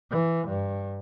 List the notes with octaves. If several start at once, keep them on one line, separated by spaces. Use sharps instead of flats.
E3
G2